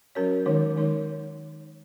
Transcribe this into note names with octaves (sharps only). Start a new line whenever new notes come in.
F#3 C#4 F#4 A#4 C#5
D#3 G#3 D#4 A#4 C#5
D#3 G#3 D#4 A#4 C#5